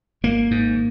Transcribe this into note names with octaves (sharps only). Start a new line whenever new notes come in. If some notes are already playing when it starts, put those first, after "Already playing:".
G#1 A#3
G#2